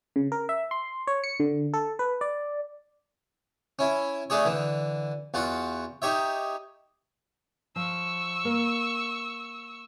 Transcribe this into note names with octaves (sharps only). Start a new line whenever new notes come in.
C#3
A#4
E5
C6
C#5
C#7
D3
A4
B4
D5
C#4 E4
A3 D4 G#4 C#5
D3 E3
E2 F4 F#4 F#5
D#4 G4 C#5 E5
F3 C#6 E6
A#3